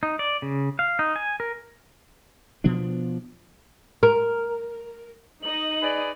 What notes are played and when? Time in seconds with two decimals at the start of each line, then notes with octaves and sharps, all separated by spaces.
0.03 D#4
0.19 D5
0.42 C#3
0.79 F5
0.99 D#4
1.16 G#5
1.40 A#4
2.64 B2 F3 B3 D4
4.03 A#4
5.43 D#4 D#5 F#7
5.82 G#4 B4 D5